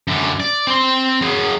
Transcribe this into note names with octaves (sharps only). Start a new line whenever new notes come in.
F#2 D3
D5
C4 C6
F#3 G#4